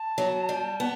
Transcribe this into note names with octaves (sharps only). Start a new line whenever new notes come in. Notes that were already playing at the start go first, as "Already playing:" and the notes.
Already playing: A5
F#3
G3
B3